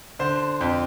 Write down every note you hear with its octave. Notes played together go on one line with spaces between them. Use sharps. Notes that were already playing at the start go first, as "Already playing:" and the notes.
D3 C5
F2